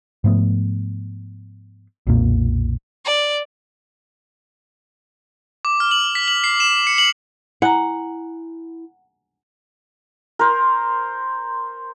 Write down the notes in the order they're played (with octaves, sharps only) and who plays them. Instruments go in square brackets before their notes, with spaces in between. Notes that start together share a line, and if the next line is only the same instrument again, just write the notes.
[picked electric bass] G#2 F3 A3 B3
B1 F2 A#2 A#3
[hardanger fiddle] D5
[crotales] D6
F6
F#7
B6
F#7
C7
E7
C#7
F#7
[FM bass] E4 [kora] F#5 [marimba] G#5 A#5
[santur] A#4 C5